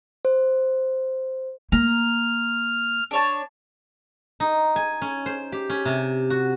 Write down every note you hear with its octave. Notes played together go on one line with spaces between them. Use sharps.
C5
A#3 A#5 F6
D4 C#5 A5
D#4
G#5
C#4
C5
G4
C#4
C3
F#4